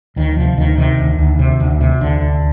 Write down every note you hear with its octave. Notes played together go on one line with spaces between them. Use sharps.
D2 D#3
C3 F3
D2 D#3
C3 D#3
D2
D2
C3
D2
C3
D2 D3
D2